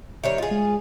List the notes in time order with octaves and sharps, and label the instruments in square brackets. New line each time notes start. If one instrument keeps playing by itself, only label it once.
[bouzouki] D#3 G3 C#5 [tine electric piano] E5
[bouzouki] F4 G#4 [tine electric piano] D#5
[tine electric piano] G#3